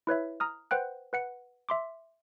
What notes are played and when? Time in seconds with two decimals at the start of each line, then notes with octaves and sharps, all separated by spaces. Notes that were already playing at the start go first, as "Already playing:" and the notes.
0.07 E4 B4 C#5 E5
0.40 A#5 D#6 F6
0.71 B4 C5 F#5 G5 F#6
1.13 B4 F#5 C#7
1.69 E5 C6 D6